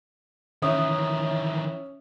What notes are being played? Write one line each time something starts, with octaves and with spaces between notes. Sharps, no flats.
D#3 E3 C#4 E5 D#6